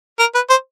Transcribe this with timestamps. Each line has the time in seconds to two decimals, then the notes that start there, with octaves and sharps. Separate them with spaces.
0.19 A#4
0.35 B4
0.50 C5